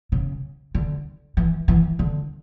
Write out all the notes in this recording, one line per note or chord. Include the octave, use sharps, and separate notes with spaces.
C#3
D3
E3
E3
D3